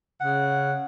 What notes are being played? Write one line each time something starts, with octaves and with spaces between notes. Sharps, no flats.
C#3 F#5